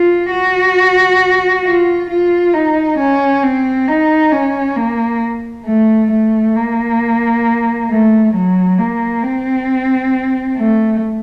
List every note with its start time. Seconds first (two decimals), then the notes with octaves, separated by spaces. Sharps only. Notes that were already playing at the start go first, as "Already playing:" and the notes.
Already playing: F4
0.31 F#4
1.65 F4
2.10 F4
2.54 D#4
2.99 C#4
3.43 C4
3.88 D#4
4.32 C#4
4.76 A#3
5.66 A3
6.11 A3
6.56 A#3
7.89 A3
8.34 F#3
8.78 A#3
9.23 C4
10.57 A3